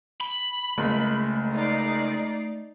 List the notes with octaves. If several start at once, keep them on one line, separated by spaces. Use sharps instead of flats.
B5
F#1 C#2 A3
D#4 D5 C7